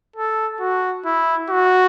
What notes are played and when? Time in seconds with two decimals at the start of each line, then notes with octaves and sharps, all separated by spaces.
0.16 A4
0.60 F#4
1.05 E4
1.50 F#4